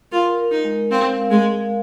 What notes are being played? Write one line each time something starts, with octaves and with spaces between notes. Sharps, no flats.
F4 A#4
A#4
D#4
G#3
C4 F5
F5
G#3
G#3